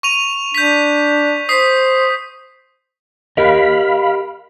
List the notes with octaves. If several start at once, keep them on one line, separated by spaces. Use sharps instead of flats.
C#6 D#7 F7
D4 G6 B6
C5 D#6 B6 C7
G4 A#4 D#5 F5 B5